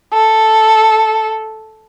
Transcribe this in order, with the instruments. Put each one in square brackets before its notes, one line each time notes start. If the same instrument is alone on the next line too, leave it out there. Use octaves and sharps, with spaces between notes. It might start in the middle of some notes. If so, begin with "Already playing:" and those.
[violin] A4